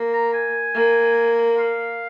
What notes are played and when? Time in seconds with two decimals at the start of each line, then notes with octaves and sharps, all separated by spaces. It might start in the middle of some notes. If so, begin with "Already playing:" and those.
Already playing: A#3
0.13 A#5
0.33 G#5
0.75 A#3
1.58 F5